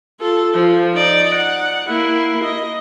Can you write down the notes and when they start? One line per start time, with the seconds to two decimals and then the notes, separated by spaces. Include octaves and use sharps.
0.20 F4 A4
0.54 F3
0.95 D#4 D5
1.35 F#5
1.89 A#3 E4
2.44 D#5